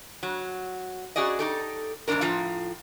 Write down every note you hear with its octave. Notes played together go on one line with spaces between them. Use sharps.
F#3
C#4 F#4 G#4 D5 D#5
D#4 G4 A4
E2 G#2 B2 D4 A#4
A2 F3 F4 A#5